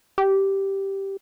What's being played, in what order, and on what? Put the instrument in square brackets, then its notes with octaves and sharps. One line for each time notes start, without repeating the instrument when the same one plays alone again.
[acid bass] G4